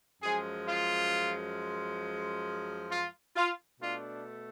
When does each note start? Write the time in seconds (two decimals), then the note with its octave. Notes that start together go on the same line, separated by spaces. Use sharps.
0.21 F#2 F3 G#3 G#4
0.67 F4
2.91 F4
3.36 F4
3.80 B2 A3 D4 F4